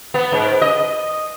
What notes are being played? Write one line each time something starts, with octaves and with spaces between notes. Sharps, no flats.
B3
G#2
D#5